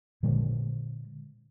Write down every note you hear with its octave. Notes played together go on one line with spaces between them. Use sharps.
A#2 D3 G#3